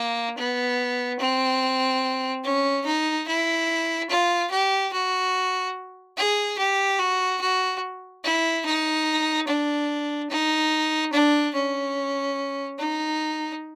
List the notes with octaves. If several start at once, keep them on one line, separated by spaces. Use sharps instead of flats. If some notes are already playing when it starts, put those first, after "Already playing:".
Already playing: A#3
B3
C4
C#4
D#4
E4
F4
G4
F#4
G#4
G4
F#4
F#4
E4
D#4
D4
D#4
D4
C#4
D#4